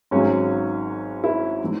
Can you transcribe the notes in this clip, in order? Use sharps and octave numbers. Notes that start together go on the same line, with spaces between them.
G#1 G#2 F#3 C#4
E4
E3